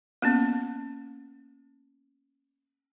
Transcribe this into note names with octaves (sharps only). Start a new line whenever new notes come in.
A#3 B3 C#4